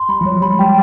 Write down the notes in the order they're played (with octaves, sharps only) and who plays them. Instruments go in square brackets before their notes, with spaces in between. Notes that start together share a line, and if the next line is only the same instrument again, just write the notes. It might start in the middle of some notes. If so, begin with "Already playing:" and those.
Already playing: [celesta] C6
[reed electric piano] G3 [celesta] B5
[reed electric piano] F3
[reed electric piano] F#3 [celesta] C#5
[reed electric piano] G3 [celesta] B5
[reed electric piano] G#3
[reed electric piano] G3 [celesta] G5